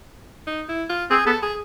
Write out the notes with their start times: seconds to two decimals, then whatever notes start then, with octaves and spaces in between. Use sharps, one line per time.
0.47 D#4
0.69 E4
0.89 F4
1.10 C4 G#4
1.26 B3 A4
1.42 G#4